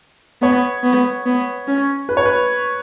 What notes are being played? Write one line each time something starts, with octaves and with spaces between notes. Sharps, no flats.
B3 C#5
B3
B3
C#4
B4
C#5
B4